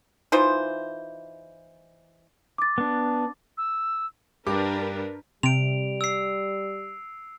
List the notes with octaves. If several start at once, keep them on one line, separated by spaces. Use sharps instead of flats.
E3 D#4 F4 C5
D6 A6
B3 D4
E6
G2 D4 G4 A#4 B4 D6
C3 G3 D7 F7
E6 C7